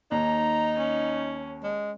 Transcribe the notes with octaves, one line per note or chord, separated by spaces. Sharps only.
D#2 D#4 A#5
C#4
G#3